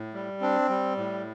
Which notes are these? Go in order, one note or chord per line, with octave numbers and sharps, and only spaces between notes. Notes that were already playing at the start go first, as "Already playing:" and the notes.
Already playing: A2
G3
C4 D4
G3
A2